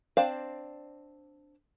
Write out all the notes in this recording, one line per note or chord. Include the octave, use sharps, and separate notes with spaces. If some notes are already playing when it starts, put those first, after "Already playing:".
C4 D4 C5 D5 F5